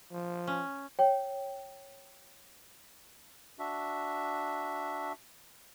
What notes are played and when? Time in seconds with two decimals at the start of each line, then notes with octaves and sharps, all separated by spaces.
0.12 F3
0.47 C#4
0.99 C#5 G5
3.59 D4 F#4 E5